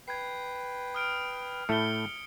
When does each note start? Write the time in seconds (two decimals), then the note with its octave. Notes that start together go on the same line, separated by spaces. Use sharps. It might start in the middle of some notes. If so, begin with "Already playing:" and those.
0.08 B4 G5 G#6 C7
0.95 D#6 F6 D7
1.69 A2 A3 E4 C#7 G7